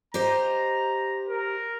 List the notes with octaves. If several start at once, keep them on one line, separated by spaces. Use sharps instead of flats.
G4 C5 D#5 A#5
A#4